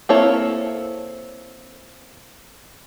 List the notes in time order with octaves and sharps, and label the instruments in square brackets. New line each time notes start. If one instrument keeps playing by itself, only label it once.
[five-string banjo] A#3 C4 E4 A4 C#5